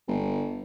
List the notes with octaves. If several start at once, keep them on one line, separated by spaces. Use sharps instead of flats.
G1